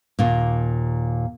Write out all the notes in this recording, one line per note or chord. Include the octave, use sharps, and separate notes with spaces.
D#2 A#2